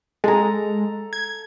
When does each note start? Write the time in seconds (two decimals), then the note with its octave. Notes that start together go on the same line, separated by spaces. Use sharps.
0.24 G#3 A4 A#5
1.13 G#6